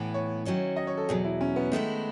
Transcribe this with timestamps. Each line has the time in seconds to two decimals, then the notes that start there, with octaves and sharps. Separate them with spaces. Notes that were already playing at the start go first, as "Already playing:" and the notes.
Already playing: A2 E3 B3 E4
0.14 C#5
0.45 D#3 F#3 C#4 E4
0.76 D#5
0.87 C#5
0.97 A4
1.09 E2 B2 F#3 G#4
1.24 E4
1.41 C#4
1.56 B3
1.72 D#3 G#3 A3 B3 E4